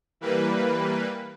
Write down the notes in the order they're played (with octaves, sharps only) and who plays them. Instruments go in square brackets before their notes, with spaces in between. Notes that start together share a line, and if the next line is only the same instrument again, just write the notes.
[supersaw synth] E3 G3 A#3 B4